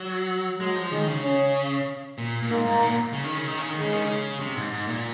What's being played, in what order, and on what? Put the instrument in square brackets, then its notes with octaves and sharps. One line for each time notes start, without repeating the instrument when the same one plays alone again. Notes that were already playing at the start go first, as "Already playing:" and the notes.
Already playing: [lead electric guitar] F#3
[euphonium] F#3 [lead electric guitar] G#3
[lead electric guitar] F3
[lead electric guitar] D#3 [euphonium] G#3
[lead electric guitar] C#3
[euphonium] C#4
[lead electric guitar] A#2
A#2
[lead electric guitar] G#2 [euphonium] A#3
[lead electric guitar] G#2
A#2
C#3
D#3
C#3
D#3
C#3
D#3
[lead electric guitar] C#3 [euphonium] G#3
[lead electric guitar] D#3
C#3
C3
G#2
G#2
A#2